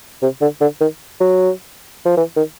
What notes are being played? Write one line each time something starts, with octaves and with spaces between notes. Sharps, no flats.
C3
D3
D3
D#3
F#3
F3
E3
D#3